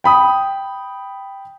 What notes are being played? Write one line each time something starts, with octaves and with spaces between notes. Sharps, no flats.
G5 B5 D#6